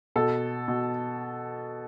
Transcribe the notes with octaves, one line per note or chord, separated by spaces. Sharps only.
B2 A4
B2